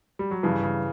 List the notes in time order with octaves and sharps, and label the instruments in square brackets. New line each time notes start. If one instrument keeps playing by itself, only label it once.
[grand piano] G3
F#3
[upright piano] G2 [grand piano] C#3 E3
[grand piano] C#3